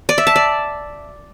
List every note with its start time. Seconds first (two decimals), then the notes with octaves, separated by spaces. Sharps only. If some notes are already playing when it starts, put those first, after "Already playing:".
0.09 D5
0.18 E5
0.27 A5
0.36 D5